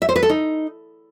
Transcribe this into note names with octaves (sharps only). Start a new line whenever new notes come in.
E5
C5
B4
A4
D#4